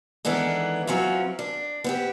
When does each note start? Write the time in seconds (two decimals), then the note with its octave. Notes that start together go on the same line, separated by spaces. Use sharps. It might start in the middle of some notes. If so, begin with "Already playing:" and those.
0.25 D#3 E3 G#3 B3 D4 A4
0.87 F#3 C4 C#4 E4 F4
1.39 D4
1.84 B3 C4 G4